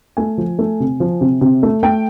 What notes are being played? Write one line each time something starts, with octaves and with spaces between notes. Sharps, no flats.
A3 G#5
F3
A3
C3
F3
C3
C3
A3
A3 G5